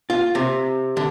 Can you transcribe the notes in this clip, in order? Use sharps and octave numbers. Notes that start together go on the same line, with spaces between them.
F4
C3
D3